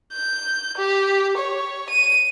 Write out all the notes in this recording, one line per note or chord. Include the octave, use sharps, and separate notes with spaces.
G6
G4
C#5
D#7